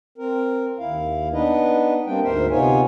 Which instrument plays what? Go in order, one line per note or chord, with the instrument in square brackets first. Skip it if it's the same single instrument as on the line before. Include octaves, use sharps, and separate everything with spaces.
[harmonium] C4 A#4
D#2 E4 F5
B3 D4 D#4 B4 D#5
G3 A#3 C4 D4 G5
D2 G#2 A#4 C5 E5
C3 B3 D#4 F4 C#5 G#5